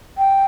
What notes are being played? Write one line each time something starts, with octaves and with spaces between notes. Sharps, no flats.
G5